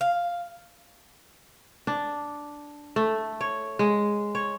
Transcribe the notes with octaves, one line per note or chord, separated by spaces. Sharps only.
F5
D4
A3
C#5
G#3
C#5